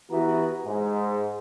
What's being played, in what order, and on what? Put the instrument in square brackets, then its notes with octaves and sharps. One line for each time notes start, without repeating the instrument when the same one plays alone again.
[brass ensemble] E3 B3 E4 F#4 G4 A#5
G#2